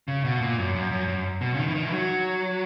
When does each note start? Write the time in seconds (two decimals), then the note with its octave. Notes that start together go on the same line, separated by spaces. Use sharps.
0.08 C#3
0.25 B2
0.41 A#2
0.58 F#2
0.75 F#2
0.91 F#2
1.08 F#2
1.41 B2
1.54 C#3
1.59 D#3
1.68 E3
1.75 D#3
1.84 E3
1.93 F#3